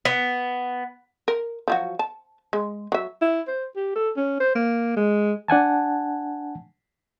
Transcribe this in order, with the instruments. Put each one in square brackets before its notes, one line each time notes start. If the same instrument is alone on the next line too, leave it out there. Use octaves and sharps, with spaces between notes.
[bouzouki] B3
[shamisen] A#4
F3 F#3 F#4
A5
G#3
F#3 E5
[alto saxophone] E4
C5
G4
A4
C#4
C5
A#3
G#3
[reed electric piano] D4 F#5 G#5 A5